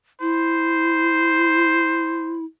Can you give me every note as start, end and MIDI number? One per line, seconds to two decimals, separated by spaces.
0.21 2.45 64
0.21 2.39 72